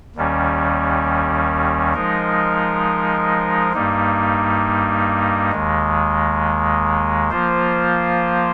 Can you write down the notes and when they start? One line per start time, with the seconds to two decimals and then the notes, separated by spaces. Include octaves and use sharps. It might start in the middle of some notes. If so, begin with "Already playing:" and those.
0.16 D#2 D#3 G3 C#4
1.93 F3 G#3 D#4 A#4
3.73 G2 G3 A#3 D#4
5.52 D#2 D#3 G#3
7.30 F3 A#3 F4 C5